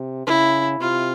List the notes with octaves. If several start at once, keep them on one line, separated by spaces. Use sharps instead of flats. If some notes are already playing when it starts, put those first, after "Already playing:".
Already playing: C3
C#3 E4
C3 F4